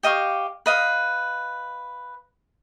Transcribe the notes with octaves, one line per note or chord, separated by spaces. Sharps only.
G4 D#5 F5 C#6
B4 D#5 F5